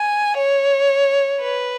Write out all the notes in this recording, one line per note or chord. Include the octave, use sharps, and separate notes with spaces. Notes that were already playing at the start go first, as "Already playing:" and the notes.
Already playing: G#5
C#5
B4